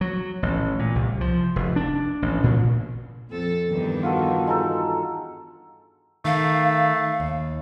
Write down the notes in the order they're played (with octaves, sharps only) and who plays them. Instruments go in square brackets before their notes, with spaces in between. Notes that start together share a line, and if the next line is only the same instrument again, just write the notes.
[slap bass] F#3
A1
A#2
C2
F3
F1
D4
A1
A#2
[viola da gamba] F2 A4
E2 G2 D#3
[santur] F4 F#4 A4
G#3 D#4 A4
[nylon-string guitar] D#3 [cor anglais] A3 [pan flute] F5
[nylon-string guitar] D#2